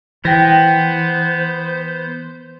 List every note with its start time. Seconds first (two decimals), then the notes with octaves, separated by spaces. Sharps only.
0.25 E3 B3 C5 G5 A#6